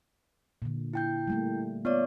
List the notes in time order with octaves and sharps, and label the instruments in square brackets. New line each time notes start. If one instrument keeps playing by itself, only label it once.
[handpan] A#2 D3
[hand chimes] E4 G5 G6
[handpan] G3 A3 A#3
[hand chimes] B3 C#5 D5 [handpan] F4